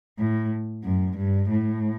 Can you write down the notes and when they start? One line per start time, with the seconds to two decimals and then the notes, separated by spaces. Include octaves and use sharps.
0.19 A2
0.85 F#2
1.18 G2
1.50 A2